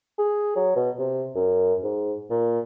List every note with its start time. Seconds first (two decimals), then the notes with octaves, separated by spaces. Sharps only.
0.18 G#4
0.56 F#3
0.76 B2
0.99 C3
1.35 F#2
1.83 G#2
2.30 A#2